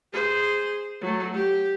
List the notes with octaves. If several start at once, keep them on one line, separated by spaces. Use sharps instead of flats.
G#4 C5
F#3 A3
G4